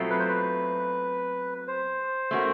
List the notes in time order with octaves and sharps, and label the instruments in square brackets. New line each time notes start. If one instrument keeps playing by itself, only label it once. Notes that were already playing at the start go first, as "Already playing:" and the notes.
Already playing: [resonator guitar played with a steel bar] B2 F#3 A3 C4 F4
[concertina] B4
C5
B4
C5
[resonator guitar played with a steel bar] A3 C#4 F#4 A#4